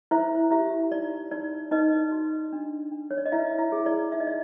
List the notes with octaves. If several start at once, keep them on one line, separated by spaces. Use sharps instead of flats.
E4 C5 E5
E4 G4 E5
D#4 D5
D#4 D5
D#4 B4 D#5
F#4
D4
D4
C#5
D5
D#5
E4 B4 E5
E4 E5
G#4
D5
D#4 E5
D#5
D5